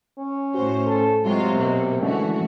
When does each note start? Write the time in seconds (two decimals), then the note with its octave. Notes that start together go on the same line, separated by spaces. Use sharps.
0.19 C#4
0.54 A2 F#4 C5
0.86 A4
1.24 C3 F#3 G#3 F4
1.56 B2 A#3
2.02 D3 E3 G#3 A3 C#4 F#4